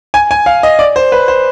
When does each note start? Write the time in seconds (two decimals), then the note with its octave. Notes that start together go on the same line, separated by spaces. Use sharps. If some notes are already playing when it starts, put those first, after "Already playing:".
0.14 G#5
0.31 G#5
0.46 F5
0.63 D#5
0.79 D5
0.96 C5
1.12 B4
1.28 C5